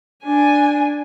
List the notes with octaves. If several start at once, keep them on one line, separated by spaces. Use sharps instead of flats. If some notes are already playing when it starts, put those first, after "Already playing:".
D4 G#5